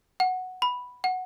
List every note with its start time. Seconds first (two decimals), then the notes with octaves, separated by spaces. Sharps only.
0.20 F#5
0.62 B5
1.04 F#5